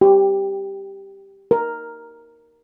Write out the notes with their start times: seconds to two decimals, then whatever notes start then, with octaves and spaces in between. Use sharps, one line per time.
0.01 G4
1.51 A#4